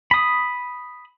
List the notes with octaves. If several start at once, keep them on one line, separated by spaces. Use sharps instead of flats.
B5 D#6